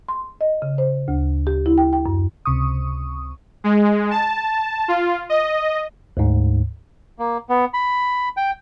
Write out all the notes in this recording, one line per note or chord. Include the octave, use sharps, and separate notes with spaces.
C6
D#5
C#3
C5
D2
G4
E4
G5
G5
F#2
C#2 C3 C#6 D#6
G#3
A5
F4
D#5
D2 G#2
A#3
B3
B5
G5